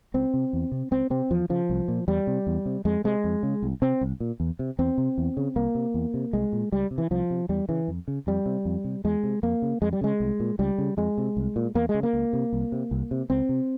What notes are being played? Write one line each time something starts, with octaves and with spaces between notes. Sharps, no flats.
C#2 C4
C3
E2
C3
C#2 C4
C3 C4
E2 F3
C#3 F3
C2
A#2
E2 G3
C3
E2
C3
F2 G#3
C3 G#3
F2
C#3
C2
C3 C4
C2
A#2
E2
C3
E2 C4
C3
E2
C#3
C2 A#3
C3
E2
C3
C2 G#3
A#2
C#2 G3
C3
E3
C2 F3
C3
E2 G3
C#3 E3
F2
C#3
F2 G3
C3
F2
C3
E2 G#3
C3
F2 A#3
C#3
F2 G#3
G3
C#3 G#3
C2
A#2
C#2 G3
C#3
F2 G#3
C3
C2
A#2
E2 A#3
G#3
C#3
A#3
C#2
C3
C2
C3
C2
C3
C#2 C4
C3